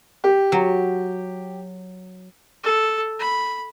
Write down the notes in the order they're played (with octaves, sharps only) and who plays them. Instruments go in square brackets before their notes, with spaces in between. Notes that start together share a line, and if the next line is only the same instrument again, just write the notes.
[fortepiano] G4
[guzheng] F#3
[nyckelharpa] A4
B5